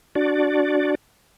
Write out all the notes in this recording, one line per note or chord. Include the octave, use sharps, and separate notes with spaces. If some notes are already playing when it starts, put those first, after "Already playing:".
D4 F#4 D5